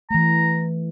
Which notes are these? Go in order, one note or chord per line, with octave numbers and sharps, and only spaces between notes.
E3 A3 A#5